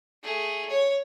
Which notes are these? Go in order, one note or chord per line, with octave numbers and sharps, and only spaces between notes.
A3 G#4
C#5